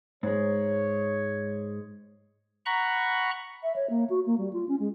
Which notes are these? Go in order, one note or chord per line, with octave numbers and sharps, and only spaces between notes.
G#2 G#3 C#5
F#5 A#5 B5 C#6 F#6
E5
C#5
A#3
F#4
A#3
G3
F4
C#4
G#3